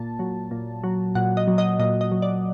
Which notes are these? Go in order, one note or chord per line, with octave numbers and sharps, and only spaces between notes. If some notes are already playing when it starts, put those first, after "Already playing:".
Already playing: A#2 A5
F#3
A#2
F#3
A#2 F#5
D#5
F#3
D#5
A#2 D#5
D#5
F#3
D5